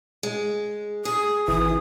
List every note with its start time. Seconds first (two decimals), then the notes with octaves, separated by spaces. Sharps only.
0.23 G#3
1.05 G#4 D#6
1.48 G#1 E3 D#6